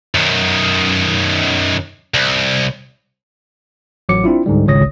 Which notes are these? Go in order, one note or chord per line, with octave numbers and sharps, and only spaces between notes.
F#2 D#3
C2
A1 F#3 D6 C#7
C4 D4 E4 F4
C#2 G#2 D3 G3
G#1 C#2 C#3 C#5 D#6 A#6